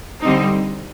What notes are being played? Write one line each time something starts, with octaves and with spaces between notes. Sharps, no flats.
D3 G3 C4 D#4